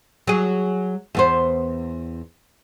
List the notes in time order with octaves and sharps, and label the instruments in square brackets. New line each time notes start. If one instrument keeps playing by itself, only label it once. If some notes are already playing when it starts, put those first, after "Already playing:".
[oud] F#3 G#4
E2 B3 C5